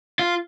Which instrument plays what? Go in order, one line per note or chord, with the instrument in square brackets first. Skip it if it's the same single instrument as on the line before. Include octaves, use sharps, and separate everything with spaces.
[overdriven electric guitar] F4